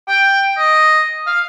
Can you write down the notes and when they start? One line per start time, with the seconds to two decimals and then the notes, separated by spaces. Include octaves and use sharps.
0.08 G5
0.58 D#5
1.26 F5